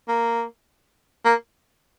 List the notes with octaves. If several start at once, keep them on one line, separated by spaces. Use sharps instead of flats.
A#3
A#3